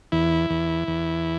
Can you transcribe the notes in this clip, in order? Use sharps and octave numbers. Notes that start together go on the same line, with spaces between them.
E2 E4
E2
E2